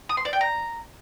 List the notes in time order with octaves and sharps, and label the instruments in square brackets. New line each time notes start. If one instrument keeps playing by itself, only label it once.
[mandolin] D#6
C6
D5
G5
A#5